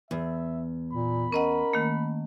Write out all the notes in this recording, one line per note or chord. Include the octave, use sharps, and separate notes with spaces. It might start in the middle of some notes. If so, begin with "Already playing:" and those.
E2 E5
A#2 B5
C#4 A#4 D#5 F#5
D#3 A3 A#3